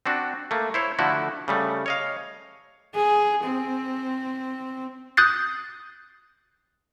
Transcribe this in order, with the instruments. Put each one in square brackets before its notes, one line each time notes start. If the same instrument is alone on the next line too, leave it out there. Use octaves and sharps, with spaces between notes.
[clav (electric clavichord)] C4 D4 F#4
A3 A#3
E4 C5 C#5
D3 F3 A3 E4 F#4
C#3 G3 A3
C#5 D#5 F5
[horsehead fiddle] G#4
C4
[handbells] D#6 F#6 G6 A6 C7